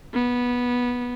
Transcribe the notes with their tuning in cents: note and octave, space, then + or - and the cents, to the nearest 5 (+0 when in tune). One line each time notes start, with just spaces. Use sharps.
B3 -15